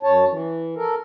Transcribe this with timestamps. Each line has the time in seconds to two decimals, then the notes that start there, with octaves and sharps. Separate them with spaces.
0.03 F#2 C#5 A5
0.29 E3
0.76 A4 A#4